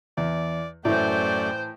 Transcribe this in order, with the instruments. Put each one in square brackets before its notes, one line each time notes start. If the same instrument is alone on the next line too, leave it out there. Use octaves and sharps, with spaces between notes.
[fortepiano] E2 [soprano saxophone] D5
[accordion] F#2 A3 [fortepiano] A2 E3 [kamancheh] C5 G5 [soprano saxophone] D5